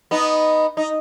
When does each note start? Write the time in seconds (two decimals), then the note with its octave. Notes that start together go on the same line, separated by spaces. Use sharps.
0.11 B3 D#4
0.77 D#4